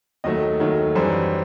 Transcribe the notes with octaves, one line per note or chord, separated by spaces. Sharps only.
D#2 D#3 F#3 A3 D#5
D#2 D#3 F#3 A3
F#2 E3 G3 C5